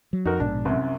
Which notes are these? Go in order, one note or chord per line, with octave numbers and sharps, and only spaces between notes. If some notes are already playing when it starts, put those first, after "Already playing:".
F#3
F2 D#4 F#4 A#4
A#1 G#2 B2 D4
C2 F#2 C3